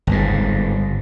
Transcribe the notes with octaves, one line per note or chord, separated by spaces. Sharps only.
G1 G#2